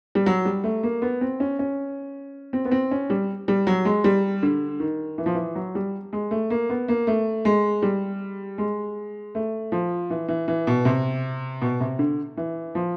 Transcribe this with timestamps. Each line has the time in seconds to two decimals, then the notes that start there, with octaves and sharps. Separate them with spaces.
0.15 G3
0.26 F#3
0.45 G3
0.64 A3
0.83 A#3
1.02 B3
1.21 C4
1.40 C#4
1.59 C#4
2.53 C4
2.65 B3
2.72 C4
2.91 C#4
3.10 G3
3.48 G3
3.67 F#3
3.85 G#3
4.04 G3
4.43 D3
4.80 D#3
5.18 E3
5.26 F3
5.35 E3
5.55 F#3
5.75 G3
6.13 G#3
6.31 A3
6.50 A#3
6.69 B3
6.88 A#3
7.07 A3
7.45 G#3
7.82 G3
8.58 G#3
9.35 A3
9.72 F3
10.10 E3
10.28 E3
10.48 E3
10.67 B2
10.85 C3
11.62 B2
11.80 C3
11.99 D3
12.37 E3
12.75 F3